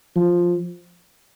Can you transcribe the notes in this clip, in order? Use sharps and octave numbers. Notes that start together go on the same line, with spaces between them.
F3